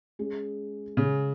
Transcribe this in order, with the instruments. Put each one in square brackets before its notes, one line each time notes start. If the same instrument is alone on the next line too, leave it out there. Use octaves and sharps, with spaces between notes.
[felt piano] G#3 C#4 G#4
[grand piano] C#3 [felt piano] G#3 C#4 G#4